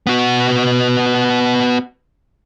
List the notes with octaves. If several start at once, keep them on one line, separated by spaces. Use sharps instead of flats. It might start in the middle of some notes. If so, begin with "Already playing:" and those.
B3 F#4